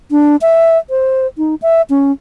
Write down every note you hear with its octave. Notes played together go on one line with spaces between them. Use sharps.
D4
E5
C5
D#4
E5
C#4